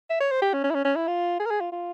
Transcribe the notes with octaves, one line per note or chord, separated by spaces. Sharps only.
E5
C#5
C5
G4
C#4
C#4
E4
C#4
C#4
E4
F4
G#4
A#4
G#4
F4
F4